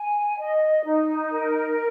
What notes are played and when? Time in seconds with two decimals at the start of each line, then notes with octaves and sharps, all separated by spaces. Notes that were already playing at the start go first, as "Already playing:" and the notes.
Already playing: G#5
0.38 D#5
0.85 D#4
1.31 A#4